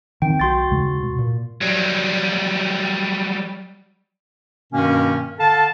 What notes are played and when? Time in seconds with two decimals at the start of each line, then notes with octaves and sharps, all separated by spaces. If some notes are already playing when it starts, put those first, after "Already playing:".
0.22 D#3 C4 G5
0.40 B1 F#4 C6 A6
0.70 D#2 C#3 G#3
1.03 B2
1.18 A#2
1.61 F#3 G3
4.73 G2 B2 D#3 A#3 C#4
5.39 D3 A4 F5 A5